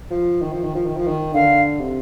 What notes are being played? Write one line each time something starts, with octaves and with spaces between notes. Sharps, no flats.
F3
D#3
F3
D#3
F3
D#3
F3
D#3
D3 F5
C3